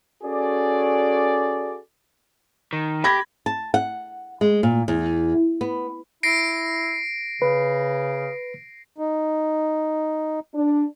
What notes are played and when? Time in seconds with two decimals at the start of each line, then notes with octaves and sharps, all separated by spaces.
0.23 C#4 F#4 G#4 A4 D5
2.73 D#3
3.04 G4 B5 G#6 A#6
3.46 A5
3.74 F#5
4.41 G#3
4.63 A#2
4.88 E2
5.61 B3
6.23 E4 A#6 C7 D7
7.42 C#3 B4
8.98 D#4
10.54 D4